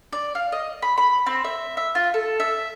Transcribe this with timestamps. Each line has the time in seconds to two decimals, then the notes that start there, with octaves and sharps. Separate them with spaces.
0.12 D5
0.35 F5
0.52 D#5
0.82 B5
0.98 B5
1.26 C4
1.44 E5
1.77 E5
1.95 F4
2.14 A4
2.40 E5